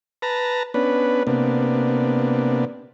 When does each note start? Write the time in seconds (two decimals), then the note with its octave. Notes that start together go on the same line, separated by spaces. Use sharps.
0.22 B4 A5 A#5
0.74 B3 C#4 D4 B4
1.27 C3 A#3 B3 D4